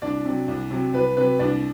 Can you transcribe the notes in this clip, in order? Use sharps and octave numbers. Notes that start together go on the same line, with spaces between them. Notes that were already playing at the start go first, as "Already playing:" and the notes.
C2 D4 D5
C3 F#3
C2
C3 F#3
C2 B4
C3 F#3 B4
C2 D4 D5